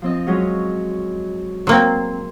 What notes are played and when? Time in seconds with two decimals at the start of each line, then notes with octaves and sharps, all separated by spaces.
0.02 F3 C4 D#5
0.27 F#3 G#3 C#4
1.67 F#3 A#3 C4 C6